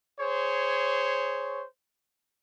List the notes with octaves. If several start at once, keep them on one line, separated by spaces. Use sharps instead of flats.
G#4 C5 C#5